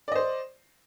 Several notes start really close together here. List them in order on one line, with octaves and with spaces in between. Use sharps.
D5 D#5 C5